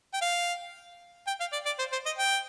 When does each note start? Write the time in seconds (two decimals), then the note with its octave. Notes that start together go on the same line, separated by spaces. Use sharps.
0.14 G5
0.22 F5
1.27 G5
1.40 F5
1.53 D5
1.66 D5
1.79 C5
1.92 C5
2.06 D#5
2.18 G5